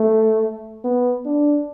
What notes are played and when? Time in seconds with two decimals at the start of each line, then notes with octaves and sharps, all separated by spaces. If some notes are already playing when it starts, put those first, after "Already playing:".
Already playing: A3
0.84 B3
1.26 D4